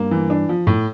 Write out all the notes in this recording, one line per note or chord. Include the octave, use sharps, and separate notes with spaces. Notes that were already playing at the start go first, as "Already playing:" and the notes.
Already playing: G2 A#3
E3
D4
F3
A2